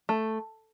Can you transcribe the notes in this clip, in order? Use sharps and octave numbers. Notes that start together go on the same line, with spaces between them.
A3